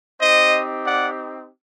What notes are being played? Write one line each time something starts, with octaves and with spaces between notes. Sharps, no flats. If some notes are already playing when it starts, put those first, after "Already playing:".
C4 D#4 G4 C5 D#5
D5 F#5